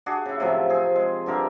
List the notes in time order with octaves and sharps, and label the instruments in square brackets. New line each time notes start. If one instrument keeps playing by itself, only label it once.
[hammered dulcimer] D4 F#4 G#4
C#3 E4
A2 C3 F3 F#3
C4 G#4
G#3
G2 D3 A#4 E5